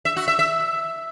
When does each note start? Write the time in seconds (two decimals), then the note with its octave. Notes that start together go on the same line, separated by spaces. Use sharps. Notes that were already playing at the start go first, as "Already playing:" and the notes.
0.05 E5
0.16 F#4
0.28 E5
0.39 E5